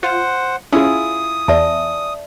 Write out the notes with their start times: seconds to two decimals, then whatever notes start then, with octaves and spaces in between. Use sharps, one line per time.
0.03 F4 C5 F#5
0.73 C#4 E4 F4 G#4 D#6
1.48 E2 D5 E5 A5